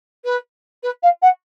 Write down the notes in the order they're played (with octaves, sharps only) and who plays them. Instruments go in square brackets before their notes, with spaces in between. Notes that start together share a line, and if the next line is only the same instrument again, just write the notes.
[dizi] B4
B4
F5
F#5